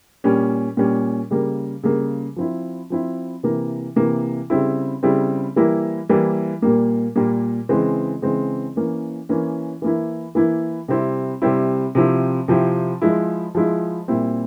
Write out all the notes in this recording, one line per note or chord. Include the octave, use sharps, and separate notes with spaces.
A#2 G3 C#4
A#2 G3 C#4
C#3 G3 A#3
C#3 G3 A#3
F3 C4 E4
F3 C4 E4
C3 E3 A#3
C3 E3 A#3
C#3 G3 C4 E4
C#3 G3 C4 E4
E3 G3 A#3 E4
E3 G3 A#3 E4
A#2 G3 A#3
A#2 G3 A#3
C#3 E3 G#3 C4
C#3 E3 G#3 C4
E3 A#3 C#4
E3 A#3 C#4
E3 A#3 E4
E3 A#3 E4
C3 G3 C4 E4
C3 G3 C4 E4
C3 F3 C4 E4
C3 F3 C4 E4
F3 G#3 E4
F3 G#3 E4
A#2 G3 C4 E4